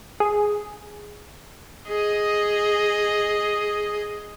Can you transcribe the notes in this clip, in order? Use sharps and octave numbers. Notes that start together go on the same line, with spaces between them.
G#4
G#4 D#5